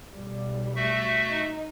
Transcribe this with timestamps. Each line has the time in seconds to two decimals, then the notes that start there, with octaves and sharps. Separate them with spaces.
0.13 B1 G3
0.76 A3 F#4 E5
1.26 D#4